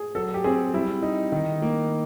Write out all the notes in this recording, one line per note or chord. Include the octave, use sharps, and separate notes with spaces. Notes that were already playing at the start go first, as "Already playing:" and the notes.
Already playing: G#4
F#3 A4
G4
C4 G#4
G3 E4
D#4
D#3
A#3